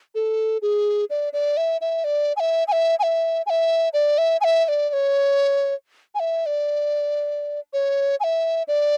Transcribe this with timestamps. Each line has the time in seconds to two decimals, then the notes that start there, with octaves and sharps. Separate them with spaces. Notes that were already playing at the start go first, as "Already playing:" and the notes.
0.15 A4
0.62 G#4
1.10 D5
1.33 D5
1.57 E5
1.81 E5
2.04 D5
2.37 G#5
2.40 E5
2.68 G#5
2.72 E5
2.99 G#5
3.03 E5
3.46 G#5
3.50 E5
3.93 D5
4.18 E5
4.41 G#5
4.44 E5
4.65 E5
4.68 D5
4.89 D5
4.93 C#5
6.15 G#5
6.20 E5
6.46 D5
7.73 C#5
8.20 G#5
8.24 E5
8.68 D5